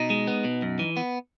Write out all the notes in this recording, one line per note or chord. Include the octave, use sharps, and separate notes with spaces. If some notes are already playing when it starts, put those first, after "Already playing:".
Already playing: B2 D#4
G#3
B3
B2
F#2
E3
B3